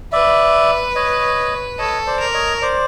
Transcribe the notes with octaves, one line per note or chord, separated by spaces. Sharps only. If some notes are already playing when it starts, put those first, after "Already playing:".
B4 D5 E5
C#5 D#5
A4 C#5 D#5
C5 D5
A#4
C#5 D#5
C5 D5